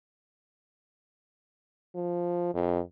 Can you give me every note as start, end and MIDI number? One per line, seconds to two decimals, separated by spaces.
1.95 2.52 53
2.54 2.80 41